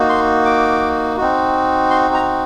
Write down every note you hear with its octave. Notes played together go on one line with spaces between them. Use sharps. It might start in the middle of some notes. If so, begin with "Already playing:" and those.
Already playing: A#3 D#4 F#4
C6
D6
C4 D#4 F#4
C6
A#5